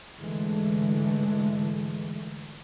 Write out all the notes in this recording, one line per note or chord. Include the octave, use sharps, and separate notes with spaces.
G#2 D3 E3 G#3 A3